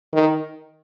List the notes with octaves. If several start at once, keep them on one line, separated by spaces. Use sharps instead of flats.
D#3